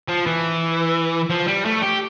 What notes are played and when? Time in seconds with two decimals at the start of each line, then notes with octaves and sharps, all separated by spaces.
0.08 F3
0.27 E3
1.30 F3
1.47 G3
1.65 A3
1.82 G4